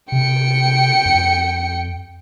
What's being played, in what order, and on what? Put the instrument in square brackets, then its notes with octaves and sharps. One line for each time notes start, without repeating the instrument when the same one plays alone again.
[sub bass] C3 [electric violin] G5 C#7
[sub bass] F2